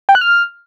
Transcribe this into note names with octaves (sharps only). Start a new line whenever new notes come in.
G5
F#6
F6